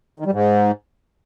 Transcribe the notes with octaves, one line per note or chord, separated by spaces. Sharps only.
D#3
G3
G#2